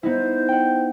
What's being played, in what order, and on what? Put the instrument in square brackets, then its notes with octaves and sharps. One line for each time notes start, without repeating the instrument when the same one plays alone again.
[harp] B3 D#4 E4 [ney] C5
[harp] F#5 G5